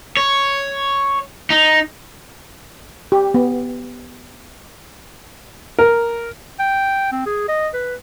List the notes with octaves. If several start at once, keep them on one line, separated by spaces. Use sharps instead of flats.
C#5
D#4
G4
B3
A#4
G5
C4
G#4
D#5
B4